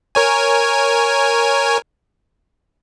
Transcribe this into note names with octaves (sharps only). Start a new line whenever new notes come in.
A#4 C#5 G#5